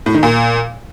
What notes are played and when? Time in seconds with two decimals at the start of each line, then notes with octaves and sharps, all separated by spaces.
0.06 A2
0.14 D#3
0.23 A#2